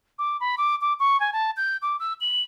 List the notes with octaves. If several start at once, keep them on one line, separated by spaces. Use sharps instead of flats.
D6
B5
D6
D6
C#6
G#5
A5
G6
D6
E6
F#7